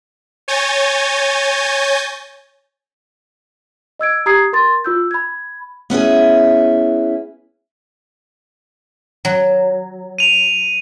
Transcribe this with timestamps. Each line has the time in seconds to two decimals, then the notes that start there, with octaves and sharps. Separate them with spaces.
0.48 C#5 G#5 G6 A6 A#6
4.00 D#5 E6 G#6 D7
4.26 G4 A#5 D#6 G#6 C7
4.53 A#4 C6 A6
4.84 F4 E6 G6
5.11 B5 G#6
5.90 B3 C#4 E4 G#4
9.25 F#3
10.18 D#7 F7